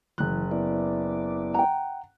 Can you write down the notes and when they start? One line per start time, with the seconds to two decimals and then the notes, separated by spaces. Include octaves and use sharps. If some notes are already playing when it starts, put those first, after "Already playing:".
0.18 F#1 E3 F#6
0.51 B3 E4 D5
1.54 F#5 G5 A#5